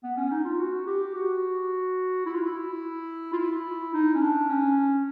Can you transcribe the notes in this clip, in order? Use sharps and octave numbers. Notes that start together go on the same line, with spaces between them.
B3
C#4
D#4
F4
F#4
G4
F#4
E4
F4
E4
F4
E4
D#4
C#4
D4
C#4